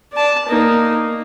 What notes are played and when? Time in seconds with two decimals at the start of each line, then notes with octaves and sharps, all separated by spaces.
0.13 D5 A5
0.48 A#3 D#4